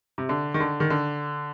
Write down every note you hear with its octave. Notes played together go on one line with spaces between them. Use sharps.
C3
D3
D#3
D3
D#3
D3